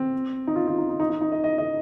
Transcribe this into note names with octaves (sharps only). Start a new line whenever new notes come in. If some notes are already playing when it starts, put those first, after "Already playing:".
Already playing: C4
D#4
F4
F4
D#4
D#4
D#4
D#4
D#4
D#5
D#5
D#5